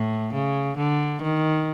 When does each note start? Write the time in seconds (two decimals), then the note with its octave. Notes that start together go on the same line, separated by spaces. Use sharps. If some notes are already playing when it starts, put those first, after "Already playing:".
Already playing: A2
0.34 C#3
0.78 D3
1.22 D#3